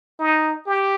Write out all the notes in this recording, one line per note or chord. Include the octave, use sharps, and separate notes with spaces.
D#4
G4